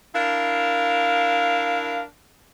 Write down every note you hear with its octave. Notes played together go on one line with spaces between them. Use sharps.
D4 E4 A#4 F5